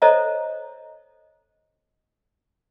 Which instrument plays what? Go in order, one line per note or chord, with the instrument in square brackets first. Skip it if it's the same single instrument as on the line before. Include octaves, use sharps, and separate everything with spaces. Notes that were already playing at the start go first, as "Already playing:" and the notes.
[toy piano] A4 C5 C#5 D#5 E5 A#5